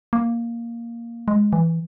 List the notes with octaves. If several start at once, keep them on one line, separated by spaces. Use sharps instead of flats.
A#3
G#3
E3